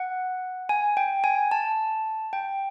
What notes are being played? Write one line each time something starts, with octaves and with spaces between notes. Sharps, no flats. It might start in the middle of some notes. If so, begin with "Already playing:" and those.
Already playing: F#5
G#5
G5
G#5
A5
G5